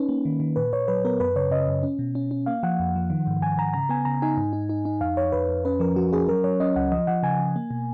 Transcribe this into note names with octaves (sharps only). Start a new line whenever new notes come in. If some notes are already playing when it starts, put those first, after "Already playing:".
Already playing: C#4 D#4 B4
A#3
D#3
D#3
A#2 B4
A#2 C#5
F#3 B4
B3 A#4
F#2 B4
C#3 C#5
C#3 D#5
F#2
C#4
B2
C#4
C#4
A#3 F5
F3 F#5
F2
F3
D#3
G#2
G#2 G#5
G#2 A#5
C#3 A#5
B3 G#5
C#3 A#5
D#4 G#5
G#2
D#4
D#4
D#4
F2 F5
F2 C#5
F2 B4
F2
C#4 B4
F3 A#4
F3 F#4
C#4 G#4
F#3 A#4
F#3 C#5
C#4 D#5
C#2 F#5
F3 D#5
F3 F#5
C#3 G#5
C#3
A#3
B2